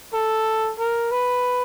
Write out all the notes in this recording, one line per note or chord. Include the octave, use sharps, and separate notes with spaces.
A4
A#4
B4